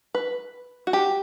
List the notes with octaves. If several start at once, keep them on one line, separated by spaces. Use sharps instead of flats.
B4
F#4
G4